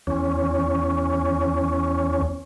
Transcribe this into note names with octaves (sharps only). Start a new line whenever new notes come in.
E2 C#4